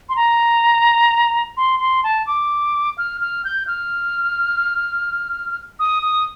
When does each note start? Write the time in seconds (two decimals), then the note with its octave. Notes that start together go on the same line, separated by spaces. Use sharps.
0.09 C6
0.16 A#5
1.57 C6
1.80 C6
2.04 A5
2.27 D6
2.98 F6
3.21 F6
3.45 G6
3.67 F6
5.80 D#6
6.03 D#6